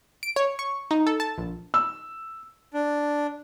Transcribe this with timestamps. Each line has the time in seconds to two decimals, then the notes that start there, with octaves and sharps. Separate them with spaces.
0.23 D7
0.36 C#5
0.59 C#6
0.91 D#4
1.07 A4
1.20 A5
1.38 A#1
1.74 E6
2.74 D4